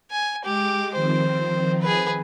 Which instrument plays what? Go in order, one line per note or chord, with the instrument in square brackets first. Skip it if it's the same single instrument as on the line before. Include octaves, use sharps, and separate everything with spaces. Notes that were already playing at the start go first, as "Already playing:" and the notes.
[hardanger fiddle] G#5
[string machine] G#3 D6 [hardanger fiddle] G4
[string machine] D#3 F3 C4 [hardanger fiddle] C5
[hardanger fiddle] G#4 B4